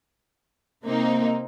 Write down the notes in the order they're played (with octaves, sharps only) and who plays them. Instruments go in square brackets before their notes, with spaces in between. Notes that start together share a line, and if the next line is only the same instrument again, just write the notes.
[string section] C3 A#3 C4 D#4